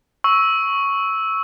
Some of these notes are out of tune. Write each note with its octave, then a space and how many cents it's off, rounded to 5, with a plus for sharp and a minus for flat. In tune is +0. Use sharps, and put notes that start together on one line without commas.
C#6 +0 E6 -10